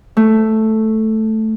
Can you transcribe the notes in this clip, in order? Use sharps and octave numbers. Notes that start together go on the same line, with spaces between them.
A3